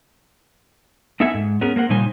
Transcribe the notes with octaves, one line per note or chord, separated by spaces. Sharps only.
B3 D#4 A4 E5 F#5 G#5
G#2
B3 C#4 G#4 A#4
A#3 A#4 C5 F#5
A#2 C#3 G3 D#4 C5 G#5